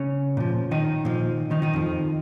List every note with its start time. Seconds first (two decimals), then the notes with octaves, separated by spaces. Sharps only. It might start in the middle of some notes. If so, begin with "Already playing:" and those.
Already playing: C#3 C#4
0.37 A#2 F3
0.71 D#3 D#4
1.05 A#2 F3
1.51 D#3 D#4
1.62 D#3 D#4
1.73 F2 F3